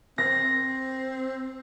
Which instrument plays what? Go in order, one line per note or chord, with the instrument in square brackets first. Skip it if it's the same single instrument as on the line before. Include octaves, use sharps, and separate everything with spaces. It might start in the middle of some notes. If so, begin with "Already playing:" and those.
[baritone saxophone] C4 [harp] A#6